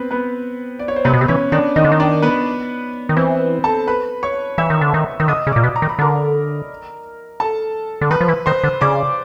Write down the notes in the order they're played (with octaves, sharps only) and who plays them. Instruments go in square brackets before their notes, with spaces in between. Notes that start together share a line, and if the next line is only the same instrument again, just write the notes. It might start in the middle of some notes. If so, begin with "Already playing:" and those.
Already playing: [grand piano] B3 C4 B4
B3 B4
D5
C#5
C5
[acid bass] C3 [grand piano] B3 B4
[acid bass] B2
C3
[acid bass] E3 [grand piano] C#4 C#5
[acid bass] D#3 [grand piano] D4 D5
[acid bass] D#3 [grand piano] D#4 D#5
[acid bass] D3
D#3
[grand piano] D4 D5
B3 B4
[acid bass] D#3
[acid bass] E3 [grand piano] C4 C5
[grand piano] A4 A5
B4 B5
C#5 C#6
[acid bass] E3 [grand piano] E5 E6
[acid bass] D#3
D3
D#3
[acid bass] D#3 [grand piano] E6
[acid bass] D3 [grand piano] D#5 D#6
[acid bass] C#3
[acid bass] A#2 [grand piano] D5 D6
[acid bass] B2
[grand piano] A#5
[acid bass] D#3
[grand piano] B5
[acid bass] D3 [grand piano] A#4 A#5
[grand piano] A4 A5
[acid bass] D3
[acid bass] D#3 [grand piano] B4 B5
[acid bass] F3
E3
[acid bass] D#3 [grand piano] C5 C6
[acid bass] D3
[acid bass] C#3 [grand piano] D5 D6